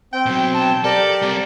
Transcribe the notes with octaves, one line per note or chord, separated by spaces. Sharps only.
C4 G5
B2 F#3
A5
G4 A4 A#4 D5
G3 C4